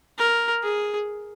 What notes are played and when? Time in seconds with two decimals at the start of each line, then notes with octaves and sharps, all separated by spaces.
0.18 A#4
0.63 G#4